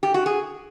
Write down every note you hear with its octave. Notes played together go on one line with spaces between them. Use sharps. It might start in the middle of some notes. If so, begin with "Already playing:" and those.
G4
F#4
G#4